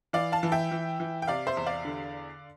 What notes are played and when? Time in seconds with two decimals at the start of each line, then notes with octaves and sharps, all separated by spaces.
0.13 E3 D5 F5
0.32 F5 A5
0.43 E3
0.52 E5 G5
0.71 E3
1.00 E3
1.22 G5
1.28 C3 D5 F5
1.47 C5 E5
1.57 E2
1.66 D5 F5
1.85 D3